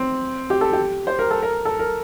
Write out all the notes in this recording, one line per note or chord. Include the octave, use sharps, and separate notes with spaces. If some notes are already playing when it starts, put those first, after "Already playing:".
Already playing: C4
G4
A4
G4
C5
A#4
A4
A#4
A4
A#4